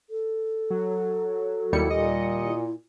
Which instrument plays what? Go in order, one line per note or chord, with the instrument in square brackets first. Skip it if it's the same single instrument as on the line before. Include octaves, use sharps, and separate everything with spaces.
[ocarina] A4
[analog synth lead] F#3
[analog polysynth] D#2 G3 C#7 [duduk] E4
[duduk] A#2 [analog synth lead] D#5
[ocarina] E4